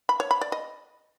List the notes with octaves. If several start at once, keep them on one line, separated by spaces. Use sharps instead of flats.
B5
C#5
B5
D5
D#5